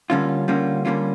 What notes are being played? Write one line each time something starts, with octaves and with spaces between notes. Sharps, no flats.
D3 G3 A#3 C#4 F4
D3 G3 A#3 C#4 F4
D3 G3 A#3 C#4 F4